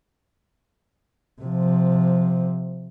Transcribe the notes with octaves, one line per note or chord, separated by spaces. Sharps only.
C3 F3